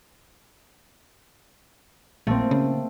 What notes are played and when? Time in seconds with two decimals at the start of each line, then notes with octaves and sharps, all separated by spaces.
2.27 A#1 A3 A#3 C4
2.51 C#3